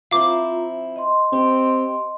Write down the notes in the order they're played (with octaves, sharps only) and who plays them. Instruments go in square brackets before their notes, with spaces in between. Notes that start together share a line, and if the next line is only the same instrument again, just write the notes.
[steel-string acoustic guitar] F3 C4 E4 [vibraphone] F4 E5 A#5 [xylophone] F5 D6
[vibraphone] D#5 C6
[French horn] C4 [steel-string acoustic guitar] G4